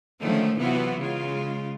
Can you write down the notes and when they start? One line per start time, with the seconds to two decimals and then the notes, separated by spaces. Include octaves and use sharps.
0.22 D3 D#3 F3 G#3 A3 C#4
0.58 C3 E3 F#3 B3 F4 F#4
0.99 C#3 G#3 F4